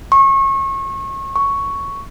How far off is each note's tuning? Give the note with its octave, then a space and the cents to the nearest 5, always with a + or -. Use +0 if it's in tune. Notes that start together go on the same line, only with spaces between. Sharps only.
C#6 -30
C#6 +5